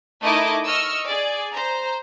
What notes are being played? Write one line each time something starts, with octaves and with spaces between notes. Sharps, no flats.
A3 D#4 E4 A#4 D#5 D6
D#5 C#6 E6 F6
G#4 D5
C5 A#5